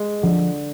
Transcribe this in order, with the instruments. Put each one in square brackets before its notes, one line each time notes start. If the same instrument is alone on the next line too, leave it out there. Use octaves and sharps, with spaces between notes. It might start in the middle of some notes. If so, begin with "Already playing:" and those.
Already playing: [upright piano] G#3
[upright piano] D3 [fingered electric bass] F3